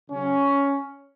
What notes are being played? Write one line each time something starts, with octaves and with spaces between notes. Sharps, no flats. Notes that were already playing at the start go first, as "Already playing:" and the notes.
C#3 F#3 C#4